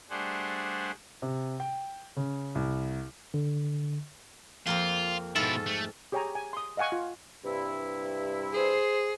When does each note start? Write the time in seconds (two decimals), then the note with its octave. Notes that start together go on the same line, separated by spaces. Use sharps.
0.10 G3 A3 D4 G#4 C5 F#5
1.22 C3
1.60 G5
2.17 C#3
2.55 C2
3.34 D3
4.67 F2 A#3 C4 F4
5.36 G#2 B2 E4 F4 A4
5.66 A3
6.12 G4 G#4 C#5 G5 G#5 A#5
6.35 G#5
6.53 C6 D#6
6.77 D#5 F5 F#5 G#5 C#6
6.92 F4
7.44 G2 C3 E4
8.54 G#4 C5